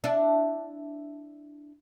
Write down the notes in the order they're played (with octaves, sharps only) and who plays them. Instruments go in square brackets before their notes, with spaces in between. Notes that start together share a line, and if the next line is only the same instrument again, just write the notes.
[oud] D4 E4